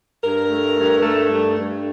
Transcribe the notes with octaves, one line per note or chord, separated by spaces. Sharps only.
G2 A#4
A3
G2
A3
G2
G2